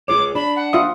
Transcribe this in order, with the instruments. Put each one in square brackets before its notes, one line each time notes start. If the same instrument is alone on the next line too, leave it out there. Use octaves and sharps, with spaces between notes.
[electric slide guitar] F4 G#4 C#5 [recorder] D6
[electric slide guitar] D4 [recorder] B5
[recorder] F#5
[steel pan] F4 E5 D#6